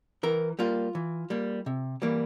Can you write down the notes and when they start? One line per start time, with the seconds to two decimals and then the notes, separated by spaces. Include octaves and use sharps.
0.23 E3 A#4
0.59 G3 A#3 F4
0.95 E3
1.30 G3 A#3
1.66 C3
2.02 E3 G3 A#3